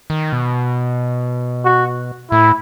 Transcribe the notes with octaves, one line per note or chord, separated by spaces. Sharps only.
D#3
B2
F#4
A2 E4